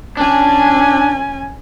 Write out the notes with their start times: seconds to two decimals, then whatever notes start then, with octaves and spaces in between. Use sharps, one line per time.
0.17 C#4 D4 G#5